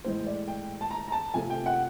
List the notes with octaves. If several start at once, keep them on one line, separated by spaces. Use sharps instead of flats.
A2 E3 G#3 C5
D5
G5
A5
A#5
A#5
A5
C3 F3 A3 G#5
G5
F#5